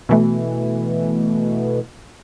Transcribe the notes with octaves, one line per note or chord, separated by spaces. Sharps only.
B2 E3 A3